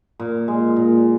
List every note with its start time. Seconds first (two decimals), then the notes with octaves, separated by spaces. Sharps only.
0.20 A#2
0.48 G#3
0.76 A#2